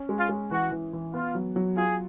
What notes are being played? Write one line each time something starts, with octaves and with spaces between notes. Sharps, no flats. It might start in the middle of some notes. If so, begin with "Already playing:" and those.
Already playing: C#4
G#3
F4
G#3
E3 F#4
E3
E3
B3 F4
F#3
F#3
F4 G#4